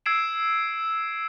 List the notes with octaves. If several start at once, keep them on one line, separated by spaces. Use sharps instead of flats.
E6 G#6 C7 D7 E7